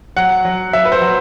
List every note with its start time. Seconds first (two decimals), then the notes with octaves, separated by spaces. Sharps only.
0.17 F#3 F#5
0.45 F#3
0.73 F#3 E5
0.85 B4
0.92 C5
1.02 F#3